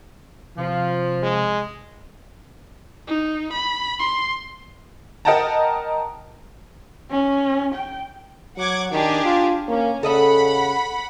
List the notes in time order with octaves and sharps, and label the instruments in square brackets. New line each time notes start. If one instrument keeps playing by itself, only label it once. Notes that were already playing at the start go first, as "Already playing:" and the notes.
[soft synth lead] C3 [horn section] F3
[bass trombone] G#3
[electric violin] D#4
B5
C6
[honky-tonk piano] A#4 D#5 F#5 G5 A5 A#5
[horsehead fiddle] C#4
G5
[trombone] F#3 [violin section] F#5 D6 G#6
[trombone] D#3 [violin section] D4 G4 G#4
[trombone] F4
[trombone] A#3 [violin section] C#4
[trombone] C#3 [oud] A4 D#5 E5 [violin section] F#5 B5